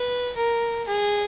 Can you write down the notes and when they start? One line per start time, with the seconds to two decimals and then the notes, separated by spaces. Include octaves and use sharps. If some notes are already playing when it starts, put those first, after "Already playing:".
Already playing: B4
0.36 A#4
0.87 G#4